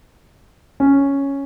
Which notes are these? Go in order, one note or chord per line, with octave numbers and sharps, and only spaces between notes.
C#4